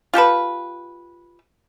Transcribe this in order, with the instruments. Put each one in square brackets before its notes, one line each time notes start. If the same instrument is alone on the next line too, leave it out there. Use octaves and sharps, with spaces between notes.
[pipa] F4 G4 A4 B4